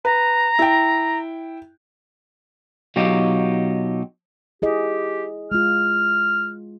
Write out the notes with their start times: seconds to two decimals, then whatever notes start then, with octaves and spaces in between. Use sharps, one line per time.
0.05 B4 A#5
0.59 E4 G5
2.96 B2 F#3 D#4 F4 G4
4.62 E4 G4 G#4 D#5
5.52 G#3 F4 F6